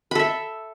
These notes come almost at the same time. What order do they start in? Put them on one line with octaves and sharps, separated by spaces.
B5 A4 E5